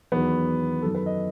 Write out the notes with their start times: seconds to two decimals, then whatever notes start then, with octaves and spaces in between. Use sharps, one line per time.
0.12 E2 D#3 F#3 B3
0.82 F#2 D#3 F#3 A4
0.95 B4
1.06 D#5